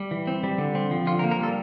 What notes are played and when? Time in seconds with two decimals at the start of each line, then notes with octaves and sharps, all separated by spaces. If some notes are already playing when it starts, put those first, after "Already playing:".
Already playing: G3
0.11 E3
0.27 C4
0.43 G3
0.58 D3
0.75 C4
0.91 F3
1.07 D3 F4
1.19 A#4
1.24 A#3
1.31 A#4
1.39 G3 A4